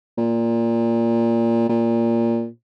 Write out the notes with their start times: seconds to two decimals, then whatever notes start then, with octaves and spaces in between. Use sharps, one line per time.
0.18 A#2
1.69 A#2